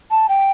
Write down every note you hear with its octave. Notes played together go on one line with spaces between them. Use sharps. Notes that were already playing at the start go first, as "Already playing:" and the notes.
A5
G5